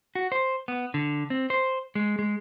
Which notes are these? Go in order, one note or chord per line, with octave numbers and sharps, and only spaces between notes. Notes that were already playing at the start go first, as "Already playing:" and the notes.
F#4
C5
B3
D3
C4
C5
G#3
G#3